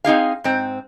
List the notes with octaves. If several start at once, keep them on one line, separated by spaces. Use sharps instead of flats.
C4 D#4 G#4 F5
G#2 C4